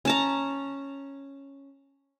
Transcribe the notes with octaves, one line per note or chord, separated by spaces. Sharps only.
C#4 A5 A#5